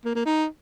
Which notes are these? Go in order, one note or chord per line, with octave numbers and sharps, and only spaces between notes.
A#3
A#3
D#4